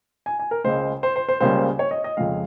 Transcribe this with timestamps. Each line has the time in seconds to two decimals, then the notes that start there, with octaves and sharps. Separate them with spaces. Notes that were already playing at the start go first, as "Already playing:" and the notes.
0.26 G#5
0.39 G#5
0.51 A#4
0.64 C#2 C#3 G#3 C5
1.03 C5
1.16 C5
1.29 C5
1.41 C#2 C#3 G3 A#3 C5
1.79 C#5
1.91 D#5
2.04 D#5
2.17 F2 C#3 F3 G#3 F5